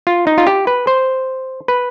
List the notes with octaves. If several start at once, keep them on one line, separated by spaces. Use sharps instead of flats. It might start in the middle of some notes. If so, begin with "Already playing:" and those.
F4
D#4
F4
G4
B4
C5
B4